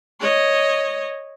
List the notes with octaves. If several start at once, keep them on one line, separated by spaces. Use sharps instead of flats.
C#5 D#5